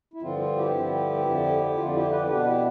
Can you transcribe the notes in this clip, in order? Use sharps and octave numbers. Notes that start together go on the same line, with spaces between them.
E4
G2 D3 F3 C4 F4
F4
E4 G4
G2 D3 F3 C4
F2 D3 F3
F2 D3 F3 F4
E4 G4
G4 B4
B2 B3 D4 G4 B4
E4 G4